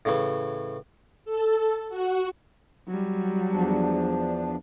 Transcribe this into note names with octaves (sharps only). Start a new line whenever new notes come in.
A2 C#3 E3
A4
F#4
F#3 G3
E2 F3 D4